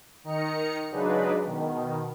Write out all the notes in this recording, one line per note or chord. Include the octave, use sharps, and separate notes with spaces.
D#3 D#4 A#5 C#7
C#3 F#3 G#3 D4 D#4 B4
B2 D#3